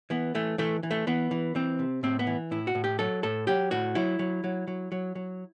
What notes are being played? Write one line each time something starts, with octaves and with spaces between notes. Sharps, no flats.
E3 B3
E3 A3
E3 A3
E3
A3
E3 B3
E3
E3 C4
C3
A2 C4
B3
E3
A2 E4
F#4
A2
G4
F#3 A4
A2 A4
F#3 G4
A2 F#4
F#3 E4
F#3
F#3
F#3
F#3
F#3